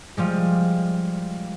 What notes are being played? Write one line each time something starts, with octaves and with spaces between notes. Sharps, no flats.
F3 G3 G#3